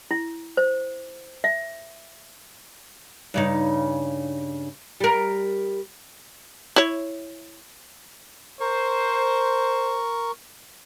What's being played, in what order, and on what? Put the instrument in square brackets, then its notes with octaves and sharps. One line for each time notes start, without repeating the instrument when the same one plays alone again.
[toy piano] E4
C5
E5
[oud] G2 C#3 D#4
G3 A#4
[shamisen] E4 C#5
[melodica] A#4 C#6 [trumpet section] C5